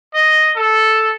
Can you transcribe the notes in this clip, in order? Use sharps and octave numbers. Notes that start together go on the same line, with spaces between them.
D#5
A4